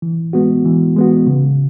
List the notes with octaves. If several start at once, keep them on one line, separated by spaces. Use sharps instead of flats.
E3
G#3 B3 F#4
E3
G#3 B3 F#4
C#3